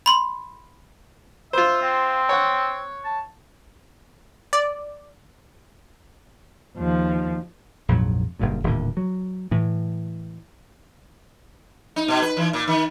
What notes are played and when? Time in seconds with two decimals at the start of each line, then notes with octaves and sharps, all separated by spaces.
0.06 B5 C6
1.53 F4 C5 E5
1.82 C4
2.29 C#5 F#5
3.04 A5
4.53 D5
6.76 D#2 F3
7.88 A#1 F2 G#2 F#3
8.39 F#1 G2 A#2
8.64 D#1 A2 D3
8.97 F#3
9.51 A2 E3
11.96 D#4
12.08 B2
12.22 B4
12.37 E3
12.53 A#2
12.67 D#3